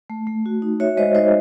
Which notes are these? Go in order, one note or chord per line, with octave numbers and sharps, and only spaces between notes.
A3
A3
F#4
D#4
F#4 C#5 E5
G#3 C5 D#5
D#4 C5 D#5